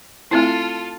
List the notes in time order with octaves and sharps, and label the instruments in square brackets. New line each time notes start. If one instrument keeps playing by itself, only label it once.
[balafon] A3 C4 E4 [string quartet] F4 A4